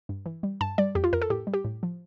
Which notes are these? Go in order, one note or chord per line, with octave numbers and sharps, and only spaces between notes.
G2
E3
G3
G2 A5
G3 D5
F2 G4
F4
F2 A#4
A4
A2 G4
G3
G4
A2
F3